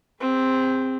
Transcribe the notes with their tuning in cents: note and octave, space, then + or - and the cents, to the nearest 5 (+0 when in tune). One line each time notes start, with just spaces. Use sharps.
C4 +0 G#4 -40